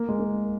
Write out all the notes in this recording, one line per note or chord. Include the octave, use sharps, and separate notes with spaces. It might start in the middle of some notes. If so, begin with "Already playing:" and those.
Already playing: A#3
G#3
A#3